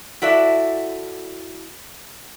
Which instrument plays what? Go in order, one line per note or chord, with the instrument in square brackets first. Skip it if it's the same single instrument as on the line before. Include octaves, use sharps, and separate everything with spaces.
[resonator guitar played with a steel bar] E4 F#4 A4 D5 E5